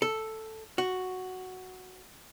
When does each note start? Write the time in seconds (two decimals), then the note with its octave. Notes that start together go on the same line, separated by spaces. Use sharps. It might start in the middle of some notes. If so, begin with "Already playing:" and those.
0.02 A4
0.78 F#4